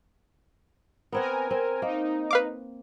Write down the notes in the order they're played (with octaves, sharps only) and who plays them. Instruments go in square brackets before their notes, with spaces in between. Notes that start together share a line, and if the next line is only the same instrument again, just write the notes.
[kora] B3 C4 F#5 [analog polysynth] A#4 G#5
[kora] C4
[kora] A#3 [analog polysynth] D#4
[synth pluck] B4 F5 D6